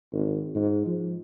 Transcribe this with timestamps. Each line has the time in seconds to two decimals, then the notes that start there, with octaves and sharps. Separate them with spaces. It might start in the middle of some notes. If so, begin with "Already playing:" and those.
0.13 G#1
0.55 G#2
0.86 F3